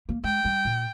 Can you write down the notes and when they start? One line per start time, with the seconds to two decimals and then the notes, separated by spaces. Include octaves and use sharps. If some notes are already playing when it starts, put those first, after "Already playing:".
0.09 A#3
0.24 G#3 G5
0.45 G3
0.65 A#2